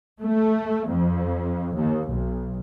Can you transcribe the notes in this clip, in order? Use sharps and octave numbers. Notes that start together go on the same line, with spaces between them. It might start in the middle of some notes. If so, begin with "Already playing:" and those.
A3
F2
D#2
B1